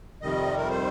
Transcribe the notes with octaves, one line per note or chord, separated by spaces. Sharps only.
F2 C3 D#3 G3 D#5
A#4
C5